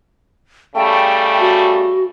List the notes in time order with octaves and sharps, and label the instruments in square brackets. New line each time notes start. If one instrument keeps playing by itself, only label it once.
[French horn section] C#3 G3 A3 [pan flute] G5
[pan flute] F#4